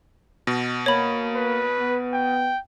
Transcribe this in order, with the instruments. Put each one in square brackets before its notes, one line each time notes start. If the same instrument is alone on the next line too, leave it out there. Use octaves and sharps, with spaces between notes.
[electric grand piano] B2
[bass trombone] A#3 [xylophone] C#5 B5
[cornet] B4
[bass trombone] B3
[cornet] G5